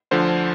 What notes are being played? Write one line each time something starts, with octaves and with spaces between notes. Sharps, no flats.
D2 D3 F3 C5